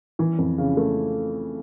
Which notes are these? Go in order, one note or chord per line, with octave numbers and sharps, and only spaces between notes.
E3
F2
C#3
A3